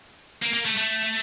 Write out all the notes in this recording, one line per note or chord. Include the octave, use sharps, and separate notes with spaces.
A#3
A#3
A3
A3